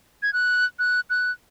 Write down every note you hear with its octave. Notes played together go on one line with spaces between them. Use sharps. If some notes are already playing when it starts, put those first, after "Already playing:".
G#6
F#6
F#6
F#6